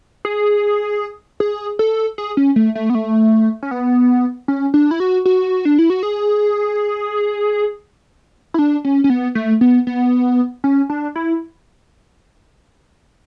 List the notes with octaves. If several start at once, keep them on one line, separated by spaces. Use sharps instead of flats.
G#4
G#4
A4
G#4
C#4
A3
A3
B3
A3
C#4
B3
C#4
D4
E4
F#4
F#4
D4
E4
F#4
G#4
E4
D4
C#4
C#4
B3
A3
B3
B3
C#4
D4
E4